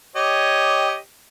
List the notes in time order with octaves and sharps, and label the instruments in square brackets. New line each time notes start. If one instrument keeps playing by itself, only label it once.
[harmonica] G4 C#5 D#5